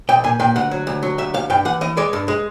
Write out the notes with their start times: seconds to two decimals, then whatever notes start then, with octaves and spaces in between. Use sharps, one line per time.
0.09 B1 G5
0.24 A#2 G#5
0.40 A#2 G5
0.56 D2 F#5
0.71 F#3
0.87 D2
1.03 F#3
1.18 D2 E5
1.34 D2 F5
1.50 G2 G5
1.65 E3 F#5
1.81 E3 D#5
1.97 G#3 D5
2.13 G2
2.28 G#3